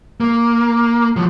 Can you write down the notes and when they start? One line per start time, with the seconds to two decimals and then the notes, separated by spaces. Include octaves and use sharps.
0.20 A#3
1.16 F3 F#3